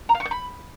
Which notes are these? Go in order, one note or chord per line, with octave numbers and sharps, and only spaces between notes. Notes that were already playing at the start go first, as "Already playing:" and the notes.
A#5
F5
C#6
G6
B5